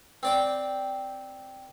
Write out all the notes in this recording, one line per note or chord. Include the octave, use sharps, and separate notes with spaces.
C4 D5 G5